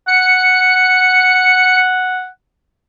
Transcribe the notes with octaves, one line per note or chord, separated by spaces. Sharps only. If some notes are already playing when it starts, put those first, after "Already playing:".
F#5 C#7